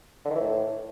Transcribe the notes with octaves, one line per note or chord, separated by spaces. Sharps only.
D3
D#3
E3
A2